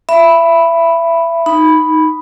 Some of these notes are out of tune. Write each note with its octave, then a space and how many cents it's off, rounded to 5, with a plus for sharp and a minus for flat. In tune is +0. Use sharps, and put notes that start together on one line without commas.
E5 +25 B5 +0
D#4 +0 B5 +0